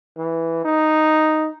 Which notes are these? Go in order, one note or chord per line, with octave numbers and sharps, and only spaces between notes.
E3
D#4